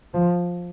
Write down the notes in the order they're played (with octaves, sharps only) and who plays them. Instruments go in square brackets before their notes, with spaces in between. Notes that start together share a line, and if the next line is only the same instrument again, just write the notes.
[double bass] F3